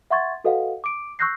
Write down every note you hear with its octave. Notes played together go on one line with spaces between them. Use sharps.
E5 F#5 C6 C#6 G#6 A6
F#4 A4 B4 D#5 F5 F#5
D6 D7
C#6 E6 F#6 G6 A#6 C7